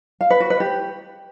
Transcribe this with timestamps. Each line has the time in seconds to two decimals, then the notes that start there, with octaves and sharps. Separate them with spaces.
0.21 F5
0.30 B4
0.40 F#4
0.50 B4
0.60 G4